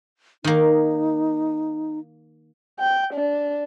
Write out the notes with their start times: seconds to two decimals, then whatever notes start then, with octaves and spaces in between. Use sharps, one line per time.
0.44 D#3 A#3 D#4
2.80 G5
3.14 D4